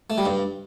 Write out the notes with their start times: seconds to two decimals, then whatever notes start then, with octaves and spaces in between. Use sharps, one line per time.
0.10 A3
0.18 G3
0.25 G2